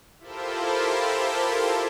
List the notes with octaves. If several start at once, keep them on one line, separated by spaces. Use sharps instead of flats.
E4 F4 G4 A4 A#4 C5